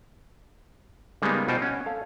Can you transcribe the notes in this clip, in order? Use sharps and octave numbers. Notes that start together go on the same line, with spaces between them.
C#3 G3 G#3 A#3 B3 D#4
B2 D#4 F4 C5 G5
C#4 F#5 G#5
A4 F5